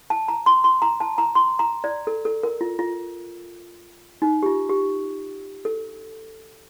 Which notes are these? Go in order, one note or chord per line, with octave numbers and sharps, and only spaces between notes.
A5
A#5
C6
C6
A#5
A5
A#5
C6
A#5
D5
A4
A4
A#4
F4
F4
D#4
G4
F4
G4
A4